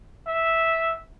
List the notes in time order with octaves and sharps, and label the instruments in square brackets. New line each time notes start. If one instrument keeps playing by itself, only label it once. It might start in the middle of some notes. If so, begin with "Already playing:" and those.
[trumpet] E5